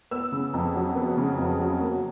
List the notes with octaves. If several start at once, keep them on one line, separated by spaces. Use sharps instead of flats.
B3 E6
C#3
F2
F#3
B3
C#3
F2
F#3
A#3